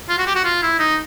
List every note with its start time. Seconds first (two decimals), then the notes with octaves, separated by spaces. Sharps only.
0.09 F4
0.18 F#4
0.27 G4
0.35 F#4
0.44 F4
0.62 E4
0.79 D#4